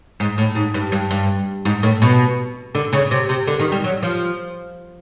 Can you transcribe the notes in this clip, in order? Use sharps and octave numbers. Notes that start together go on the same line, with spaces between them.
G#2
A2
G#2
G2
G2
G2
G#2
A2
B2
D3
C#3
C3
C3
D3
D#3
G3
F#3
F3